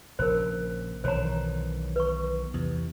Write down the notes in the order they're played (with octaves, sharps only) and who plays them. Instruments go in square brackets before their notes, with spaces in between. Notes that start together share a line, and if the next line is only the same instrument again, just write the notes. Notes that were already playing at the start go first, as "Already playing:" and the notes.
[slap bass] A#1 C#3 [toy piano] A#4 C5
[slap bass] B1 D#3 E3 [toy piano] C5 C#5 A#5
[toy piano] B4 C#6
[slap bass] E2 C3